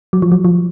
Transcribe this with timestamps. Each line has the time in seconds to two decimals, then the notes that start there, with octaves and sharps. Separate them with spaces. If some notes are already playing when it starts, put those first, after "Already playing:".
0.13 F#3
0.22 F3
0.32 F#3
0.45 F3